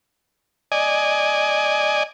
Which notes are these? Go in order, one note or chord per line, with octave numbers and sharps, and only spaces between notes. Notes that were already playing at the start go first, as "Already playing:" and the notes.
D5 D#5 G#5